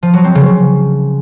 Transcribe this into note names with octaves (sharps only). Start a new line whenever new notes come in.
F3
F#3
C4
C#3